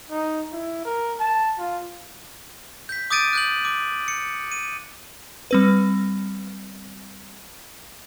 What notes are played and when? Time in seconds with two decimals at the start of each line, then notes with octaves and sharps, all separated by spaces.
0.10 D#4
0.53 E4
0.85 A#4
1.20 A5
1.58 F4
2.89 G6 B6
3.10 D6 D#6 G6 A6 D7 D#7
3.33 F#6 G6 F#7
3.65 D6
4.08 C#7
4.52 D#7
5.51 G3 C4 B4